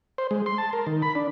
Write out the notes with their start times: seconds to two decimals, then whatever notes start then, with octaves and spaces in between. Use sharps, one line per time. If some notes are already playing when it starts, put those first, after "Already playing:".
0.18 C5
0.31 G#3
0.46 C6
0.58 A5
0.73 A#4
0.87 D#3
1.02 B5
1.15 D4